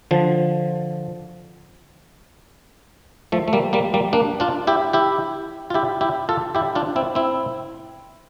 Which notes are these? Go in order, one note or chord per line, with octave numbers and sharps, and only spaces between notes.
D3 F3
F3 A3
A3
G3 A#3
G3 A#3
G3 A#3
A#3 D4
D4 F4
E4 G4
E4 G4
F4
E4 G4
E4 G4
F4 A4
E4 G4
D4 F4
C4 E4
C4 E4